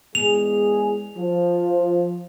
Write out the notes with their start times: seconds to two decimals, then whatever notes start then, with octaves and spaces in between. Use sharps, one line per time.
0.15 E2 G#3 G#4 F7
1.17 F3